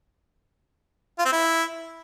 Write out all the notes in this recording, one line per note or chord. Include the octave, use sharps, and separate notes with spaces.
F4
C4
E4